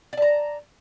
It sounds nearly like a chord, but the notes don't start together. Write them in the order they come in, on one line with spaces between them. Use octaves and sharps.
D5 A5 A#5